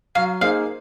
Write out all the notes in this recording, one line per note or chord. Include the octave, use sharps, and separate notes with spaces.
F#3 F5
A#3 D#4 G#4 C5 F5